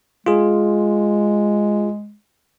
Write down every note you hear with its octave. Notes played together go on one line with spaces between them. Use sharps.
G#3 F4 G#4